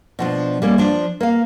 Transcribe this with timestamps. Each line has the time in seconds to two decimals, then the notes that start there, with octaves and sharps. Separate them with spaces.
0.19 B2 F3 D4
0.62 G3 A#3 C#4
0.78 F3 D4
1.20 A#3 F5